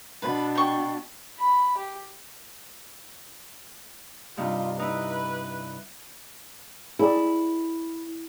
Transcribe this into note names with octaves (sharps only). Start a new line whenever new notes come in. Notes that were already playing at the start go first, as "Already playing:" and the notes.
B2 D4 B4
G5 C#6
B5
G4
G2 C3 D#4 F4
D#4 E4 B4
E4 G4 G#4 D5